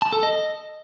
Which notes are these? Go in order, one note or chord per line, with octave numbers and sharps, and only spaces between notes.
A5
A4
D#5